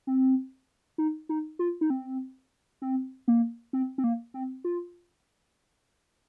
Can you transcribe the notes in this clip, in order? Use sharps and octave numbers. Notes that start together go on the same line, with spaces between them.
C4
D#4
D#4
F4
D#4
C4
C4
A#3
C4
C4
A#3
C4
F4